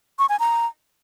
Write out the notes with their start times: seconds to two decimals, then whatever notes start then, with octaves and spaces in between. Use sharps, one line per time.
0.19 C#6
0.29 G#5
0.40 A#5